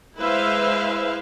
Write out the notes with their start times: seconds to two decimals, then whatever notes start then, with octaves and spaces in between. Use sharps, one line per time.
0.18 G#3 E4 B4 C5 E5 F5